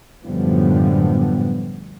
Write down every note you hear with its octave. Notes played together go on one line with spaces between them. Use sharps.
F#2 A2 D3 F3 G3 B3